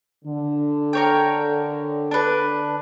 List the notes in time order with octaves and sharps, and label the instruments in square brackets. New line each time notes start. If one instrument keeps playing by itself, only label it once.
[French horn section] D3
[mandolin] A#4 C#5 G5
D4 B4